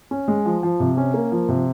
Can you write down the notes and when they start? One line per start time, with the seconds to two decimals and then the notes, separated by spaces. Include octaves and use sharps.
0.11 C#4
0.28 G#3
0.46 F3
0.63 F3
0.80 C3
0.97 C#4
1.14 A#3
1.32 F3
1.49 C3